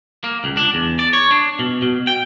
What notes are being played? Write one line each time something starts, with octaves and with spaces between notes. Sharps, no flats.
A#3
C#2
D4
E2
D5
C#5
D4
B2
B2
G5